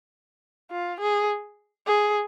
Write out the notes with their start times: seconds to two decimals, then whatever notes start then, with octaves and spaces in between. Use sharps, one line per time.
0.71 F4
1.00 G#4
1.87 G#4